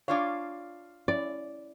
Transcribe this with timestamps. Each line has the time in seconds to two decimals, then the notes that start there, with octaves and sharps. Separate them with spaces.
0.08 D4 F4 C#5 D5 F5
1.08 C#4 E4 D5